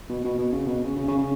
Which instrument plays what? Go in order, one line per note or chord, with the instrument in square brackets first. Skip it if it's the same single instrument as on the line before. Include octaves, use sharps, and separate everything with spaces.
[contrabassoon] B2
B2
B2
C#3
B2
C#3
C#3
C#3
C#3